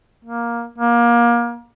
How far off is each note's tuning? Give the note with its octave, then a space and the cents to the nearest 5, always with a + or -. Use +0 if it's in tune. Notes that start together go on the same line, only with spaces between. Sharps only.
A#3 +10
A#3 +25